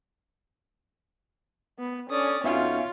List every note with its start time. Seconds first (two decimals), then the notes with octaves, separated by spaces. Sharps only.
1.79 B3
2.10 C#4 D4 A4 D5 D#6
2.44 F2 B3 C#4 D#4 F4 F#4 E5 F5